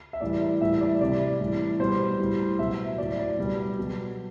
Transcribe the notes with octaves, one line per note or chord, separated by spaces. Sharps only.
E5
A2 E3 G3 D5
A2 E3 G3 E5
D5
C3 G3 D5
A2 E3 G3
B2 G3 C5
A2 G3
B2 F#3 E5
A2 F#3 D5
D5
B2 G3
B2 F#3